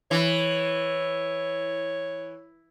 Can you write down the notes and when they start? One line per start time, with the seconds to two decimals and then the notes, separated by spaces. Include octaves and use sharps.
0.11 E3 C#5